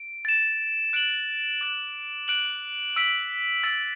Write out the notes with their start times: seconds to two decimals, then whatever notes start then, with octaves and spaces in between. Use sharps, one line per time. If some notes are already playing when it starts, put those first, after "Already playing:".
Already playing: D7
0.25 A6 E7
0.93 F#6 D7 F#7
1.61 D6 F#6 A6 E7
2.28 F#6 D7 F#7
2.96 E6 B6 D7 F#7
3.63 E6 A6 D7 F#7